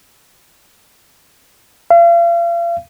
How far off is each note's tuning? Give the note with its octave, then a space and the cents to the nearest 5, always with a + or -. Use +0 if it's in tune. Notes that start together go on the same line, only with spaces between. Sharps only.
F5 -40